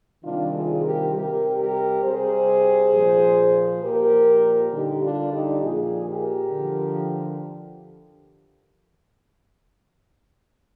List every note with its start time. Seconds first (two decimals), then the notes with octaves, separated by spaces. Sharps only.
0.24 C3 D#3 G3 D4 F4
0.54 F4 G#4
0.84 G4 A#4
1.14 C3 G3 G4 A#4
1.59 G4 A#4
2.03 C3 G3 G#4 C5
2.92 A#2 F3
3.82 A#2 F3 G4 A#4
4.72 D3 G3 D#4 G4
5.02 D4 F4
5.32 D#4 G4
5.62 A#2 F3 F4 G#4
6.07 G4 A#4
6.52 D3 F3